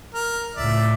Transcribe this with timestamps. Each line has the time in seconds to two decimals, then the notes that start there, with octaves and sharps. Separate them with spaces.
0.14 A#4
0.56 C#2 A2 D5 E5